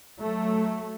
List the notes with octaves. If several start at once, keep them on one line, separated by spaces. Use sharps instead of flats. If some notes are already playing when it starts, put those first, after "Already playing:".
F#3 A3